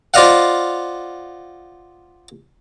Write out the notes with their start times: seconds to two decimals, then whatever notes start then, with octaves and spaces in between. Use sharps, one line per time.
0.14 F4 C5 D5 D#5 F5 F#5